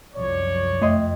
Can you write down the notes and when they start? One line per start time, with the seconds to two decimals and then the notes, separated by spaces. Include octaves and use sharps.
0.14 C2 F#2 F3 C#5 D5
0.81 F2 A3 D#5 C6